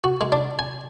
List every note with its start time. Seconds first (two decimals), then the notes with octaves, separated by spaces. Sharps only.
0.04 F#4
0.21 G#3
0.32 D4
0.59 G#5